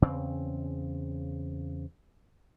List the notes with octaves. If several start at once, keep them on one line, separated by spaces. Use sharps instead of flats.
E2 C#3 C4